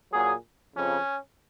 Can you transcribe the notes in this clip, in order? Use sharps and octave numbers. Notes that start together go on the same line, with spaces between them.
A#2 F#3 G#4
F2 C#3 F3 C#4